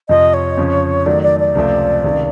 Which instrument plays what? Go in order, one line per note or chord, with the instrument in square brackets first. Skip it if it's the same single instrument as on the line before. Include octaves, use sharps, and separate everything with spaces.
[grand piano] F2 C3 F3 [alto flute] D#5
[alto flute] C#5
[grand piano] F2 C#3 F3
[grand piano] D#3 F#3 A3 [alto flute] D5
[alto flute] D5
D5
[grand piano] C#2 C3 F3 A3 C4
C#2 C3 D#3